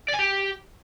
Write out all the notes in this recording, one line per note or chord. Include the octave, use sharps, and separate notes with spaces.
D5
G#5
G4